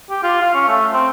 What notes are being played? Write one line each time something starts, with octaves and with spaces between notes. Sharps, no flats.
G4
F4
F5
C#4
A3
C4